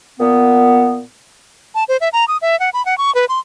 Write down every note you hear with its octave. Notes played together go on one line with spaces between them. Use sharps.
A#2 B3
A5
C5
E5
A#5
D#6
E5
F#5
B5
F#5
C#6
B4
C6